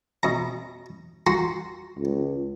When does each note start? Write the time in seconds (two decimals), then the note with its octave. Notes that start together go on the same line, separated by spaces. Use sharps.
0.23 B2 A#5
1.27 F#4 A#5 C6
1.99 C#2